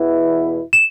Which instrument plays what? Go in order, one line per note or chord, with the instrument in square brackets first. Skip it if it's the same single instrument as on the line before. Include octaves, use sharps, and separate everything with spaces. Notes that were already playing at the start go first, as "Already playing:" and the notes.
Already playing: [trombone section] E2 B2 B3 E4
[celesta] E7